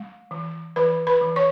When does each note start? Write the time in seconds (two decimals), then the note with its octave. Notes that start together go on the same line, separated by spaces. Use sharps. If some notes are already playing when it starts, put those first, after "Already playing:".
Already playing: G#3
0.31 E3
0.76 E3 B4 B5
1.07 B4 B5
1.21 E3
1.36 C#5 C#6